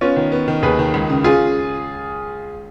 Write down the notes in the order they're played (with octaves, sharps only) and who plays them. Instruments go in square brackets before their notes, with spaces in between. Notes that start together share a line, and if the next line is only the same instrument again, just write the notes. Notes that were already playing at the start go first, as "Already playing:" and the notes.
[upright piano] B3 [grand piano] C#4 F4
[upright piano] D#3
B3
D#3
[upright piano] D#2 [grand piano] G#4 B4
[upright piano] D#3
C#2
C#3
[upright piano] C#4 [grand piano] F4 G#4